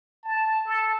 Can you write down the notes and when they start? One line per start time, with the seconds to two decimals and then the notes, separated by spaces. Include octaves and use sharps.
0.24 A5
0.66 A4